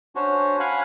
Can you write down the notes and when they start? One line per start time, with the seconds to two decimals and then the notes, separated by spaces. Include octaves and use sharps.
0.16 C#4 D4 F#4 C5 C#5
0.60 F5 F#5 G#5 B5